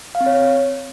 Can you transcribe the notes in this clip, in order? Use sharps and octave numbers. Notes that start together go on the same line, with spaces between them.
F5
C4
C#5